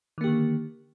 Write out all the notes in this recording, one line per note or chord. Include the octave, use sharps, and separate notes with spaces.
D3 D#3 A#3 G4